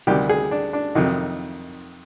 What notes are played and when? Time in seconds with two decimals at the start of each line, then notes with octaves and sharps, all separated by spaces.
0.07 D2 C3 D#3 G3 G4
0.29 G#4
0.51 D4
0.73 D4
0.95 F2 C3 D#3 F#3 D#4